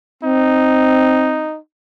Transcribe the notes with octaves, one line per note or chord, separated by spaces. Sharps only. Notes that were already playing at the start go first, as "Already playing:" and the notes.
C4 D#4